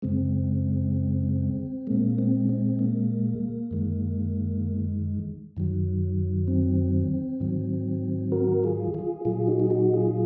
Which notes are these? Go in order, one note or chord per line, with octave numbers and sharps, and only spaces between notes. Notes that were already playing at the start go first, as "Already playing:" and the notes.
F#2 C#3 G#3 C4
A#2 G#3 A#3
C4
C4
A#3
F#2 D#3 G#3
F#2 D#3 F#3
C4
G#2 D#3 F#3
F#4 A#4
F4 G#4
F4 G#4
A#2 F#3 F4 G#4
D#4 F#4
G#4
D#4 F#4
F4 G#4